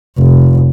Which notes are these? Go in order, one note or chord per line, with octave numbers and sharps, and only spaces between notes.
F1